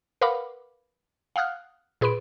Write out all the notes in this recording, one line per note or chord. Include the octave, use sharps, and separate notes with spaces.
A#4 B4 F5 F#5 B5 D6
F5 F#5 D#6 F6 F#6
A#2 G#4 B4 B5 C6 D7